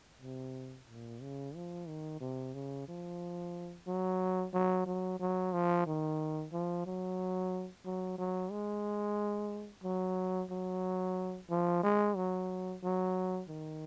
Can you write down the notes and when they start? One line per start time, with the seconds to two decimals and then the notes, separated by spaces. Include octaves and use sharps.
0.21 C3
0.89 A#2
1.22 C#3
1.55 F3
1.88 D#3
2.21 C3
2.54 C#3
2.88 F3
3.87 F#3
4.54 F#3
4.86 F#3
5.19 F#3
5.53 F3
5.86 D#3
6.53 F3
6.86 F#3
7.85 F#3
8.18 F#3
8.51 G#3
9.84 F#3
10.50 F#3
11.50 F3
11.83 G#3
12.16 F#3
12.83 F#3
13.49 D#3